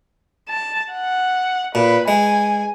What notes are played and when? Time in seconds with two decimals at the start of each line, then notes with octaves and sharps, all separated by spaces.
0.49 A5
0.93 F#5
1.75 A#2 B4
2.08 G#3 G#5